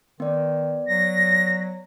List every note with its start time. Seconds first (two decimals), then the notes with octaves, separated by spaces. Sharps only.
0.20 D#3 B3 D5
0.88 F#3 A#6